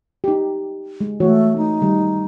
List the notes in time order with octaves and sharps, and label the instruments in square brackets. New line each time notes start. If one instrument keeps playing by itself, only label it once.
[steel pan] D#4 G4
G#3
[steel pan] E3 F#4 C#5 [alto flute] A3
[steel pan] A3 [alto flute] D#4
[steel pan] D#3 G3